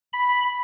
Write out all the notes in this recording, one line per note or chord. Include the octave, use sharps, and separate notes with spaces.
B5